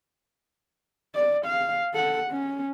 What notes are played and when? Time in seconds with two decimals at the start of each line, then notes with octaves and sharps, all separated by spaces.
1.15 D5
1.46 F5
1.94 A4 F#5
2.31 C#4